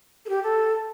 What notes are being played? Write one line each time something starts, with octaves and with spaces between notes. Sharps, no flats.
A4
G4
A4